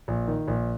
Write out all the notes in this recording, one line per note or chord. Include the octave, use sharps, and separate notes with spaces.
A#1
D#3
A#1